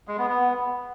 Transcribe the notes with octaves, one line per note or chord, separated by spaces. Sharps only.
G#3
B3
B3